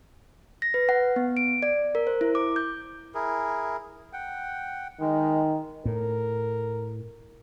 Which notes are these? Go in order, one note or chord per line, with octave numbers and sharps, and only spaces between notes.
A#6
B4
F#5
B3
D7
D5
A#4
C5
E4
D6
G6
E4 G#4 A#4
F#5 G5
D#3 G#3
A2 A#4